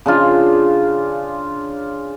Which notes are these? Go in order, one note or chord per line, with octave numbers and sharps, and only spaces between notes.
C#3 D4 F4